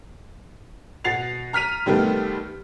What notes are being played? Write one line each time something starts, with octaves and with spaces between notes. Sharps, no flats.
B2 F#5 A6 C7 F7
A#5 F6 B6 D#7 F7
C3 D#3 G3 A3 B3